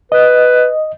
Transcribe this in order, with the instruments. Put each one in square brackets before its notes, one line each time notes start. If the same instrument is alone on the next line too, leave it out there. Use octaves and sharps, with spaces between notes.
[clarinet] B4 [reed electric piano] D#5